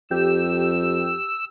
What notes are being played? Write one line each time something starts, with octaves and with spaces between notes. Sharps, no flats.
F2 G4 E6